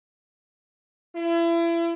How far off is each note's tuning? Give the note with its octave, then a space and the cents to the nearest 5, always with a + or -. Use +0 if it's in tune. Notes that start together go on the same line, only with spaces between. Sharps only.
E4 +35